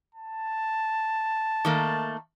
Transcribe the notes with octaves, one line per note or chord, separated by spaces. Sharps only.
A5
D#3 A3 A#3